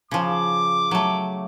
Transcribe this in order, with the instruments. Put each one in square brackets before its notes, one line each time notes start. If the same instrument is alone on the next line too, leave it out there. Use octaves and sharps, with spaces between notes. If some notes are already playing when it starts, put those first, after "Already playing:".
[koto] C#3 F3 [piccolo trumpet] D6
[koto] F#3 A3